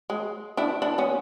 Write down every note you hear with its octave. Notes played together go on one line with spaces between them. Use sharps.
G#3
D4 E4
D4 E4
B3 C#4